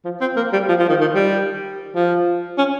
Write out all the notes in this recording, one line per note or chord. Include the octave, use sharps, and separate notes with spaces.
F3
C4
A#3
G3
F3
F3
D#3
D#3
G3
F3
C#4